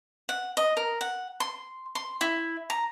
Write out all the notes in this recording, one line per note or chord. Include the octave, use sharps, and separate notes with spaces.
F#5
D#5
A#4
F#5
C6
C6
E4
A#5